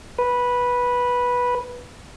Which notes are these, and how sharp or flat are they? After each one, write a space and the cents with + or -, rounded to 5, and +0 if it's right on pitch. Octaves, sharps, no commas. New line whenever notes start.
B4 -10